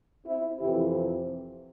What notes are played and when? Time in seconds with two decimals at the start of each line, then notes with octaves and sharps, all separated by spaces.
0.25 C4 E4
0.59 F2 C3 E3 E4 G4